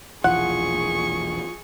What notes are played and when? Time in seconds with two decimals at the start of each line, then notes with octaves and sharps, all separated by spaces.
0.24 E1 A#1 E3 F4 G#4 F#5 C#6